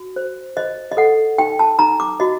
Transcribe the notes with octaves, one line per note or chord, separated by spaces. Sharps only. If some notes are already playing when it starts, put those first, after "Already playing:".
Already playing: F#4
C5
C5 D#5
D#5
A4 F#5
D#4 G5
A5
D#4 A#5
D6
F#4 D#5